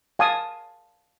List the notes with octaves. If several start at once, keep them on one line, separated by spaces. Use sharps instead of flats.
F5 G#5 A5 D#6